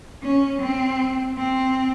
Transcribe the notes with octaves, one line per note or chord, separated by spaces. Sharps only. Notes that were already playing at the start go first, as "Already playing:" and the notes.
C#4
C4
C4